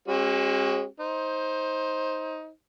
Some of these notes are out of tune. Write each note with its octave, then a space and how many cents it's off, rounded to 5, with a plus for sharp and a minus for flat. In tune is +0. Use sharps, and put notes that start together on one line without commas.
G#3 -10 C#4 -45 F#4 +25
D#4 +20 C5 +15